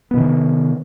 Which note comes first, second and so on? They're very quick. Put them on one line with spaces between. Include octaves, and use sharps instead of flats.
B3 C3 D#3